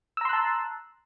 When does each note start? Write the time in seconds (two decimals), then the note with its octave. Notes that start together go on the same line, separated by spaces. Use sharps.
0.17 E6
0.21 A#5
0.25 C6
0.29 F#6
0.33 A5